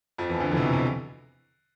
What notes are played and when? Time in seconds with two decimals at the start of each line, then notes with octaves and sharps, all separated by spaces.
0.18 F2 F3
0.30 E2 E3
0.40 D2 D3
0.52 E2 E3
0.57 C3
0.62 B2
0.73 C3